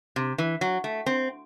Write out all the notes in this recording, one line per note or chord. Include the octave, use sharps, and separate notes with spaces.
C3
E3
F#3
A3
C4